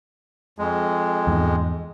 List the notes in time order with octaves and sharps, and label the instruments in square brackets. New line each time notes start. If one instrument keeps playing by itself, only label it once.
[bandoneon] F2 G#3
[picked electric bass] E2 G#2